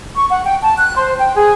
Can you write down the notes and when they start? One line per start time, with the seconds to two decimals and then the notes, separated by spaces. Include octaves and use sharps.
0.15 C#6
0.30 F#5
0.44 G5
0.62 A5
0.77 F#6
0.96 C5
1.19 G5
1.35 G#4